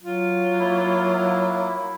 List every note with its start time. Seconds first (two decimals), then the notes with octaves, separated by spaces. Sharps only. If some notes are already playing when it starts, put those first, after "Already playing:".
0.03 F#3 F4
0.59 A#3 E4